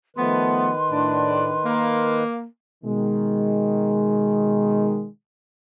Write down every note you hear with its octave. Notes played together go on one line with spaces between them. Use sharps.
D#3 F3 A3 B3 B4 C6
A2 D4
A#3
B2 D#3 G#3